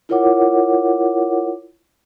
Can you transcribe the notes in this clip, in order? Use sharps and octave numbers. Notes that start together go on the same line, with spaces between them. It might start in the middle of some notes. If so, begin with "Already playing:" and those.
E4 F4 A#4 C#5 F#5 D6